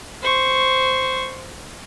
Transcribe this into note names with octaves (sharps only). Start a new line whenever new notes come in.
C5 C#6